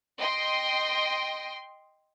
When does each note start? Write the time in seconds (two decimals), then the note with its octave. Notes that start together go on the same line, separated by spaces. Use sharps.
0.19 D#5 G5 C6